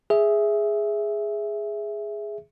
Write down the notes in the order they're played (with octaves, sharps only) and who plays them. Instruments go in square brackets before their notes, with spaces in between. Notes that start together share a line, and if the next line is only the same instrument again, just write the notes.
[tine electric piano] G#4 E5